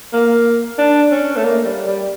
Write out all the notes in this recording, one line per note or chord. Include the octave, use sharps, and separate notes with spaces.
A#3
D4
C#4
A3
A#3
G3
G3